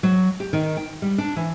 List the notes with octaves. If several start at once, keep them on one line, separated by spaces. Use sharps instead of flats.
F#3
G4
D#3
G5
G3
D4
E3